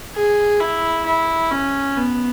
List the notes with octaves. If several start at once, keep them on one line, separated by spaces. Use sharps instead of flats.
G#4
E4
E4
C#4
B3